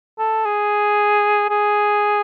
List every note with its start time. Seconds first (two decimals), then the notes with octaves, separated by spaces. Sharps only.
0.18 A4
0.45 G#4
1.50 G#4